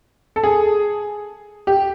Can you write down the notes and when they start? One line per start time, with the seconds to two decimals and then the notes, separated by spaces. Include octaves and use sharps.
0.36 A4
0.44 G#4
1.67 G4